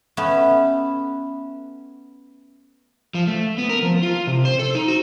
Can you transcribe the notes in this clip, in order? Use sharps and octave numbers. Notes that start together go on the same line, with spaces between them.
A3 B3 C#4
F3
A3
B3
A#4
F3
F4
C3
C5
A4
D#4
F#4